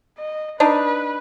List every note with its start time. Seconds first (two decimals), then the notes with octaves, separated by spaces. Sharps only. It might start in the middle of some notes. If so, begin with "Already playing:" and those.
0.18 D#5
0.60 D4 D#4 B4